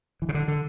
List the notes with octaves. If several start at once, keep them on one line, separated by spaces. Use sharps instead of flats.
E3
C#3
D3
D3